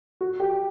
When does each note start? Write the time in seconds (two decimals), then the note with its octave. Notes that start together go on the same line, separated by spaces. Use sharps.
0.21 F#4
0.40 G4